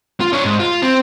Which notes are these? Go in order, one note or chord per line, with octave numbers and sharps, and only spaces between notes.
F4
D4 C#5
G#2
F4
C4